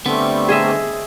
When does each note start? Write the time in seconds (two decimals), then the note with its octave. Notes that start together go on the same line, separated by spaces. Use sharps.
0.06 D3 G3 A3 B3 C4
0.49 G#4 D#5 E5